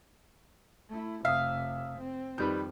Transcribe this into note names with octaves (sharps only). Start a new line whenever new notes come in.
A3 E4
F1 C3 E5 F5 D#6
C4
F2 D#3 G3 B4 G6